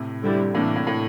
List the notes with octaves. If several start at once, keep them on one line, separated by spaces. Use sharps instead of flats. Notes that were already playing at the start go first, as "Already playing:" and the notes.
Already playing: A2 C3
D3 G3 C4 E4 G4
A2 C3 E3 A#3 D4
A2
A2